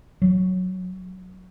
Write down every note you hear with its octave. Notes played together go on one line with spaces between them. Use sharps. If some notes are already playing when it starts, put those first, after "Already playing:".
F#3